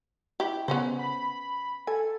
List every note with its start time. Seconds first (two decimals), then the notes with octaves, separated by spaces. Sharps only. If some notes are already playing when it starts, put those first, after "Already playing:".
0.40 E4 G4
0.68 C#3 B3 C#4 C5
0.99 B5
1.87 A4 G#5